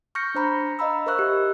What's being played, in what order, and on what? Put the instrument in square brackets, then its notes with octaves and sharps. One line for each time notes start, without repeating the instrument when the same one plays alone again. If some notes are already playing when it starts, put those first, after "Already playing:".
[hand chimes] C#6 F6 G6 A#6 C#7
D4 C5 A#5 B5
D#5 F5 A#5 B5 E6
A#4 C5 E5 C#6 E6 F#6
G4